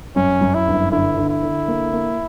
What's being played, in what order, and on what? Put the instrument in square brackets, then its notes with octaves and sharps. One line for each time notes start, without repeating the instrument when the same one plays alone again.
[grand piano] F#2 [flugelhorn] C#4
[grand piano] F#2
[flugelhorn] E4
[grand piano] G1
[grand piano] D3 [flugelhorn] E4
[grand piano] D3
[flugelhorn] E4
[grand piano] D3
A#3
A#3